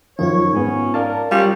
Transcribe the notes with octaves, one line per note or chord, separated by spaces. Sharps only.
F#2 D#3 F3 D#4 F4 C#5
G#2 B3 C#4
A#4 D5 F5 A5
G3 C#4 F4 F5